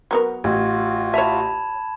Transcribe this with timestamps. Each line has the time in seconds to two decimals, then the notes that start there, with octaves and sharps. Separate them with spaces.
0.11 F#3 B3 A#4
0.44 A1 F4 F#4 G#6
1.14 C#5 E5 A5 B5 E7